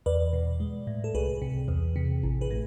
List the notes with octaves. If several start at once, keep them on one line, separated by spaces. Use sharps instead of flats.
E2 B4 D5
B2
G#3
A2
A4
C2 G#4 B4
C3
E2
C3
A1
G#4 B4
A2